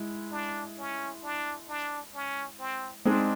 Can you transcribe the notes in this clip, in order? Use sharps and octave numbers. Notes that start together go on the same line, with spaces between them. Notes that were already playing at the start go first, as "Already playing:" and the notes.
Already playing: G#3 E4
D4
C#4
D4
D4
C#4
C4
G#3 C4 D4 D#4 G#4